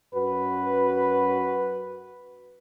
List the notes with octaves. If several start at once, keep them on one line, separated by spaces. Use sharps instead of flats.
F#2 F#4 B4